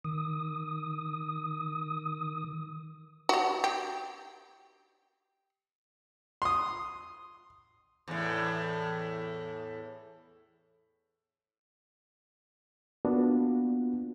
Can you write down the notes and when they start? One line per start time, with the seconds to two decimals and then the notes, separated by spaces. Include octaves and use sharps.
0.05 D#3 D#6
3.29 F#4 G4
3.64 G4
6.42 C6 D#6
8.08 E2 A2
13.05 A#3 B3 D4 F4 F#4